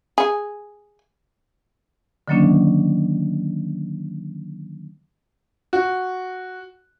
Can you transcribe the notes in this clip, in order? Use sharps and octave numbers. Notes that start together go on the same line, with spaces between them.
G#4
D3 D#3 F#3 A#3 C#4 D4
F#4